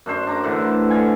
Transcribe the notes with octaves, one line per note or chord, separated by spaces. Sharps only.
F#2 D4 C5 C6
D4 A#5 D6
A2 D3 E3
D3 F4 G#5